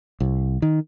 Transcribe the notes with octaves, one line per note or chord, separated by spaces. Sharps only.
C2
D#3